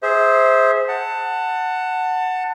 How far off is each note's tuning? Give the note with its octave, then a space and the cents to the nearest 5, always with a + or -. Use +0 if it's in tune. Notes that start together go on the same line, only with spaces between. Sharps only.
G#4 +0 C5 +0 E5 -25
F#5 +0 A5 +20